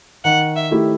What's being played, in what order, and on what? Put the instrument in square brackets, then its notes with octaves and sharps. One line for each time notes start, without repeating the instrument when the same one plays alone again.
[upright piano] D#3 [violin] F#5
[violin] E5
[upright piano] A3 E4 G4